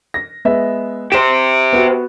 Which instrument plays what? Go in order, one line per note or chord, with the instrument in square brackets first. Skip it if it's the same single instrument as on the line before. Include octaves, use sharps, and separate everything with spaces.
[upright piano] A#6
G#3 B3 E5
[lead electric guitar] G4 C5 [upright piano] E7
[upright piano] B3 F#4